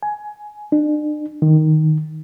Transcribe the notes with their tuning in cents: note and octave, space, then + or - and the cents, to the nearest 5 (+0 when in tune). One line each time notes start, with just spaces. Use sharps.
G#5 +15
D4 +40
D#3 +0